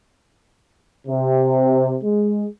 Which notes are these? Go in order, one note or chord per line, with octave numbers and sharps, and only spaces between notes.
C3
G#3